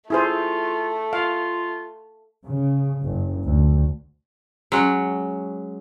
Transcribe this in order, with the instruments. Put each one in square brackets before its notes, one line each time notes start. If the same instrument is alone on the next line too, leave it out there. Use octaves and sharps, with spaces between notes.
[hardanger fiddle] A3 [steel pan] E4 G#4 C5 [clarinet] F4
[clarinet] F4 [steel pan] F5
[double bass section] C#3
F#1
D2
[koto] F#3 G#3 C#4 F#5